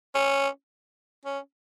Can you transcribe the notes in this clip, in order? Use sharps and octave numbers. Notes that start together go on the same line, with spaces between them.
C#4
C#4